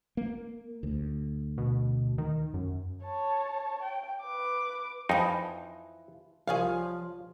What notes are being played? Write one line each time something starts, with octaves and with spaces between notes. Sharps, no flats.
A#3
D2
B2
D#3
F#2
C#5 A5
G5
B4 D6
F2 E3 F3 D#4
C2 F3 G#4 C#5 F5